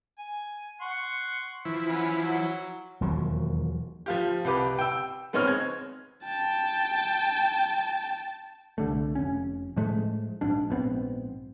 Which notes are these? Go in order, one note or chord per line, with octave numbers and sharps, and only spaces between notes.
G#5
F#5 C6 C#6
E3 F3 E4
C#4 F#4 B4
F#3
E1 D#2 F3 F#3
F3 F4 G4
C2 G4 B4 D6
G5 E6
G#3 B3 C4 D#4 C#5 F6
G#6
G5 A5
C2 D3 A3
F1 C#4
A2 F3 G#3 A3
A#1 G#2 D4
A#1 G#2 B3 C4